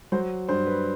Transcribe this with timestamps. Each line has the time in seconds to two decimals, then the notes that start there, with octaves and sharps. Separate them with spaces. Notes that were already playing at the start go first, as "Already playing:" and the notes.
0.12 F#3 C5
0.49 G2 C5
0.67 B4